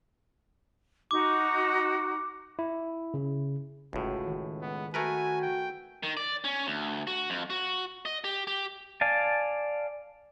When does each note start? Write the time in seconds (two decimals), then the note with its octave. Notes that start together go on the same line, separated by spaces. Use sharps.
1.11 D#4 F#4 D6
2.59 E4
3.14 C#3
3.93 G1 C#2 A2 F#4
4.27 D#3
4.62 G#3 B3
4.94 A3 F#4 A#4 B4 G#5
5.42 G5
6.03 D#3
6.17 D5
6.44 C#4
6.67 D2
7.07 F#4
7.30 F2
7.50 F#4
8.05 D#5
8.24 G4
8.47 G4
9.01 D5 F5 G#5 A5